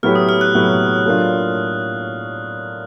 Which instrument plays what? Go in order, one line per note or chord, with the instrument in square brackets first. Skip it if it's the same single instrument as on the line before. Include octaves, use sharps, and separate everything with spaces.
[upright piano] A2 F#3 B3 E4 G4 [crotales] F6
[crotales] D#6
F6
F#6
[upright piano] A2 F#3 B3 E4 G4
A2 F#3 A#3 D4 F4